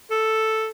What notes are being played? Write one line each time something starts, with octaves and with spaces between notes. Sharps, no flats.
A4